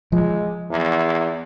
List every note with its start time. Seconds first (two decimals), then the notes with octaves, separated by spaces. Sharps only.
0.12 F3 G#3
0.71 E2